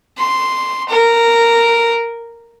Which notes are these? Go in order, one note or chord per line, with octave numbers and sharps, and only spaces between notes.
C6
A#4